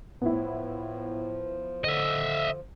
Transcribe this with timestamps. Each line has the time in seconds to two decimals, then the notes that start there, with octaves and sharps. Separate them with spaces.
0.22 A2 F3 B3 E4
1.84 D3 D#5 E5